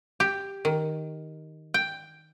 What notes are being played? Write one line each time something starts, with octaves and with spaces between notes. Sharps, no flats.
G4
D#3
G5